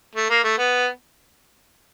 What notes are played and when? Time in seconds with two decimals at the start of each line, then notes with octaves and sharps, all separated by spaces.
0.15 A3
0.30 A#3
0.44 A3
0.58 B3